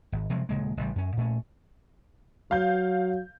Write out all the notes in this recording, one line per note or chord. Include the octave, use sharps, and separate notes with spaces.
G#1
C3 F3 F#3 G#3
D#1 C#3 G#3 A#3
A1 C#3 G3
F#2 C#4
A#2 A3 C#4
F#3 F5 G6